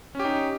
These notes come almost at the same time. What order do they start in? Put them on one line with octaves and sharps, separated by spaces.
C#4 G4 D#4